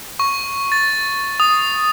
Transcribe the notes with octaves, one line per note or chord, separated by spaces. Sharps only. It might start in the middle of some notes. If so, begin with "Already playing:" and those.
C#6
A6
D#6